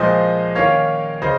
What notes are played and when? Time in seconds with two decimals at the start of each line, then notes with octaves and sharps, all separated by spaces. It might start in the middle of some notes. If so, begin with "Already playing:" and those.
Already playing: A#2 F3 G#3 C5 D#5
0.55 D#3 A#3 C#4 C#5 F5
1.22 C#3 C5 D#5